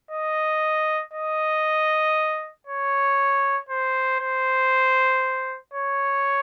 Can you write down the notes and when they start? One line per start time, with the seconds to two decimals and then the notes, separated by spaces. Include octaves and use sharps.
0.11 D#5
1.14 D#5
2.67 C#5
3.69 C5
4.20 C5
5.74 C#5